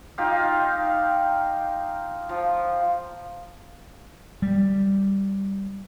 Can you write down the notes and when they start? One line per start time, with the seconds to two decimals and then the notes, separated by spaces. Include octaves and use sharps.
0.18 D#4 F4 G4 F5
2.29 F3
4.42 G3